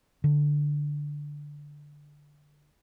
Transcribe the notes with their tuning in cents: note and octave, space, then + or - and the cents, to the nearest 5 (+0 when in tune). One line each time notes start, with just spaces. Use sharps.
D3 +0